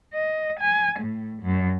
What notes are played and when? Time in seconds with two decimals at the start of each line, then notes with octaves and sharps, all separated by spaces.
0.14 D#5
0.60 G#5
0.99 A2
1.43 F#2